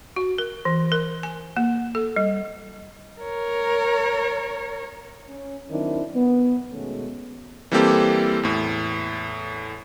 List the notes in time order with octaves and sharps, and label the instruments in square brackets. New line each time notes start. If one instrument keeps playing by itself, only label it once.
[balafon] F#4
A#4
E3
A#4
G#5
A#3
A4
G3
[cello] A#4 C#5
[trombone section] C#4
D#3 F#3 C4 D4 E4
B3
B2 D#3 G#3 A3 C#4
[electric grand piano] E3 G3 A#3 C4 G4 A4
E2 A2